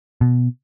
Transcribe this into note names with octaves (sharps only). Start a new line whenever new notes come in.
B2